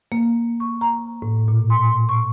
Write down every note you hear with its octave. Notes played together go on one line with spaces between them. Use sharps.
A#3
C#6
A#5
A2
A#2
C6
C#6